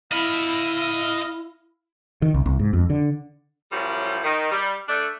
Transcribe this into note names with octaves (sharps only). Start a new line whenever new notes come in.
E4 D#5 F5 B5
D#3
C2
C2
G#2
F2
D3
F#2 A2 F3 G3
D#3
G3
A3 D4